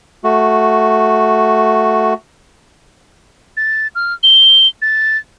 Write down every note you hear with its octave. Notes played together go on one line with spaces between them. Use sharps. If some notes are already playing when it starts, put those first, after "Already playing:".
A3 F#4
A6
F6
G7
A6